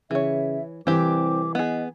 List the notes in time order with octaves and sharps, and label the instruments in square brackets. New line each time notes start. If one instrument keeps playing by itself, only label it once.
[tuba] C#3 [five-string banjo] E3 C#5 [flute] E5
[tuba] C2 [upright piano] E3 [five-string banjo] C4 G4 [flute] D6
[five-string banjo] B3 G#4 [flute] D#5